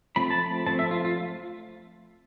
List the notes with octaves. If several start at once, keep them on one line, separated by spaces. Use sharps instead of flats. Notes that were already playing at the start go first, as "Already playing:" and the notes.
F3 A3 C4 B5
A5
B5
F3 A3 C4 A5
E5
F4
F4